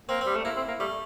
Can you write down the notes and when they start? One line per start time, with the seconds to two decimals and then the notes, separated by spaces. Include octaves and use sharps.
0.09 A#3 C4
0.21 G3 C4
0.35 A3
0.44 A#3 E4
0.56 C4
0.68 A#3
0.79 G3 A3